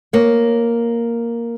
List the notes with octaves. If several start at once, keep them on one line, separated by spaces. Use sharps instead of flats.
A#3 C#5